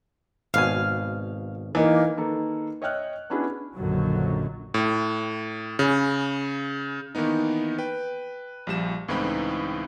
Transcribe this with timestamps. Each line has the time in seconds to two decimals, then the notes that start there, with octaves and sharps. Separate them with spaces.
0.54 G#1 B2 F5 G#5
1.75 E3 A#3 D#4
2.17 D#3 A#3 A4 B4
2.82 C#5 D#5 E5 G5 F6 F#6
3.30 B3 C#4 D4 E4 F#4 G#4
3.75 A#1 F#2 A#2 D3 D#3 F#3
4.74 A2
5.79 C#3
7.15 D#3 E3 A#3 B3 D#4
7.78 B4 G5
8.67 A#1 F3 G3 E7
9.08 C#2 A2 E3 C4 D#4 B5